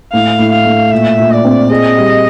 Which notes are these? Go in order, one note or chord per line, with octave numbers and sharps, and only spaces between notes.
A2 F5
A2
F5
A3
A#2 E5
A#2
D5
C4
G#4 D#5
G3